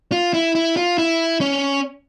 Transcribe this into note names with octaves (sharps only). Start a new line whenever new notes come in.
F4
E4
E4
F4
E4
C#4